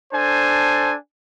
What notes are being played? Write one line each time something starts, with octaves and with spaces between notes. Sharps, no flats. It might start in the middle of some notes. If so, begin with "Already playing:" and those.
D4 A4 C5 G#5 A5